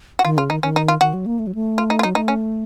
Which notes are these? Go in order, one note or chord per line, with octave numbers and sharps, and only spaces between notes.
F#4
D#3 F4
C#3 F4
D#3 D#4
D#3 C#4
D#4
F4
D#3 F#4
F#3
A#3
A3
F#3
A3
F4
D#4
F4
F#3 D#4
A3 D#4
C#4